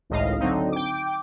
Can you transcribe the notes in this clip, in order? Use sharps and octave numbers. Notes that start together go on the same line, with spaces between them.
G#1 C#2 A2 D#5 F5
D3 F#3 C4 D#4
G5 D6